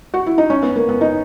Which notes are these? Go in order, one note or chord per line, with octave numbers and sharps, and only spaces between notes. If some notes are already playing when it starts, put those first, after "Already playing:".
F#4
E4
D#4
C#4
B3
A#3
B3
D#4